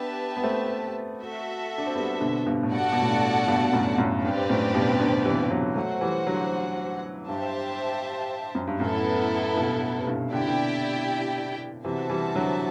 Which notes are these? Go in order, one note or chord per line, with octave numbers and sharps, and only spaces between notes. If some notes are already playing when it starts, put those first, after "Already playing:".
Already playing: B3 D4 G4 B4 E5 A5
B3
A3 C4
F#4 A4 E5
D4
C4
G3 B3
B2 D3
G2 B2
A2
G2 F#4 A4 D5 F#5 A5
B2
A2
G2
G2 B2
B2
F#2 A2
F#2 A2
G2 C4 G4 B4 D5
F#2 A2
G2 B2
B2 D3
C3 E3
D3 F#3
F#3 A3 F#4 C5 F#5
E3 G3
D3 F#3
G2 G4 C5 E5 A5
F#2
G2
F#2 A2 B3 E4 A4
G2 B2
C3
G2 B2
D3 E4 G4 D5 G5
C3
B2 D3
C3 E3 F#4 C5 E5 A5
E3 G3
D3 F#3